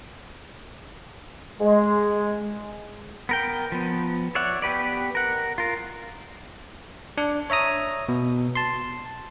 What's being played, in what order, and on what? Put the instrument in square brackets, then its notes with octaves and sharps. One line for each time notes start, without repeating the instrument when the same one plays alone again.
[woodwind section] G#3
[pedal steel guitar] B3 A#4 G5
F3 B3
C#5 D5 E5 F#5
B3 G4 B4 D5
A#4 F#5
F4 A#4
[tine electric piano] D4
C#5 E5 A#5 D#6
B2
A5 C6